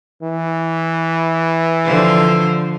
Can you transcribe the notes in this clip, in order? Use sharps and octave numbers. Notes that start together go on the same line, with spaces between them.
E3
D3 F3 C5